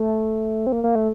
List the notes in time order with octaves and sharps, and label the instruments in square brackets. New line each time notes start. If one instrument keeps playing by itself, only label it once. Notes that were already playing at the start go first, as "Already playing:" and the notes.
Already playing: [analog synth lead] A3
C4
A#3
A#3
A3